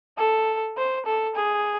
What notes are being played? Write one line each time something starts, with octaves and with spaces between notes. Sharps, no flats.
A4
C5
A4
G#4